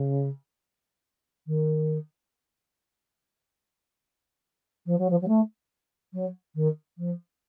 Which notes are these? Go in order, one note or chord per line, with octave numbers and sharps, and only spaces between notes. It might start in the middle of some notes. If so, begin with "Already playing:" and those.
Already playing: C#3
D#3
F3
F#3
F3
F#3
A3
F#3
D#3
F3